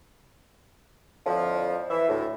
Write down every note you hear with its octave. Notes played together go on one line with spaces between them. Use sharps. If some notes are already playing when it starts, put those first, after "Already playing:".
F2 A2 D3 F3
E3 E5
D2 A2